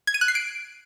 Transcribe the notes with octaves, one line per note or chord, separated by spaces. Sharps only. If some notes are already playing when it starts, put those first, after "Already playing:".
G#6
D#7
F#6
C7
D7